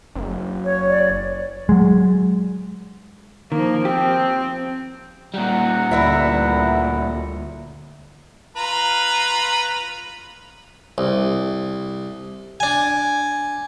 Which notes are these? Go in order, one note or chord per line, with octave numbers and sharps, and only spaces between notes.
F#1
C#5
D5
F#3 G#3
D#3 F3 A#3
C4 G4
A#2 G3 F#5 A#5
D2 G2 E4 E5
F4 B4 A#5
C2
D4 G#5